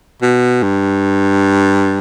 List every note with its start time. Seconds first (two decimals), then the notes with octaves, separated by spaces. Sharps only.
0.22 B2
0.63 G2